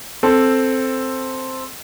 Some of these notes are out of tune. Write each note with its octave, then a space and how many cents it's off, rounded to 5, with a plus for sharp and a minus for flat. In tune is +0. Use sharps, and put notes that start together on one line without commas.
C4 +0 A4 +0